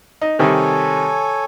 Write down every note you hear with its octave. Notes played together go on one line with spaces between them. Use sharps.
D#4
C3 D#3 G3 A4 C#5 G#5